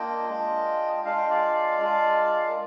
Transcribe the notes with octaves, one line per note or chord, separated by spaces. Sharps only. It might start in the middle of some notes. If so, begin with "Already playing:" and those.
Already playing: A#3 D4 F4 D#5 G5
G#3 D4 F4
G#3 D4 F4 F5
G5
D5 F5
G#3 D4 F4
A#4